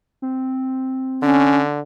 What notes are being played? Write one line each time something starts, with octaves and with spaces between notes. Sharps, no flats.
C4
D3 C#4